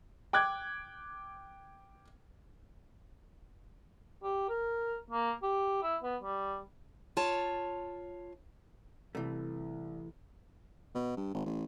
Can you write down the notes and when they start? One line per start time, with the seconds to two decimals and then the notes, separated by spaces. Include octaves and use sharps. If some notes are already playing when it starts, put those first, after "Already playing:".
0.33 G5 D6 F#6 G#6
4.23 G4
4.49 A#4
5.10 A#3
5.43 G4
5.83 E4
6.03 B3
6.23 G3
7.17 F4 C#5 A5
9.15 C2 E3 A3
10.95 B2
11.17 G2
11.34 G#1
11.46 A1